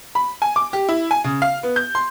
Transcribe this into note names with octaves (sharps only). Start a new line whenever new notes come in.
B5
G#5
D6
G4
E4
G#5
C#3
F5
B3
G6
C6